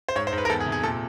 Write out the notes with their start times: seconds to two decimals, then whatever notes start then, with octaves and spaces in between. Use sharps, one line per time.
0.09 C5
0.16 G#2 C#5
0.27 C5
0.33 G#2
0.38 B4
0.45 A#4
0.50 E2 A4
0.60 G#4
0.66 C3
0.72 G#4
0.83 A#2 A4